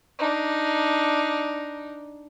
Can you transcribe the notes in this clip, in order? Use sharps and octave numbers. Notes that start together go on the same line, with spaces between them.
D4 D#4